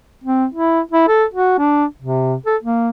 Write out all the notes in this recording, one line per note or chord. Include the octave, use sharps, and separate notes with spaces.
C4
E4
E4
A4
F#4
D4
C3
A4
A#3